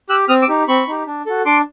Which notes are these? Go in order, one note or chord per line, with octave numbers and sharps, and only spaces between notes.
G4 E6 F#6
C4 D#6 F6
D6 E6
D#4 G4
C4 B5 C#6
D#4 G4
D4
F#4 A4
D4 C6 D6